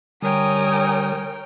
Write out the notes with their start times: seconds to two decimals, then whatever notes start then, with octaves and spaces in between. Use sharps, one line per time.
0.22 D3 G3 A#4 C#5 G5 G#5 D#6